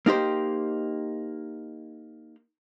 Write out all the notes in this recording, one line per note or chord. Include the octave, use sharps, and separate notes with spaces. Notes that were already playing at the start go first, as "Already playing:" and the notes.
A#3 D#4 G4 C5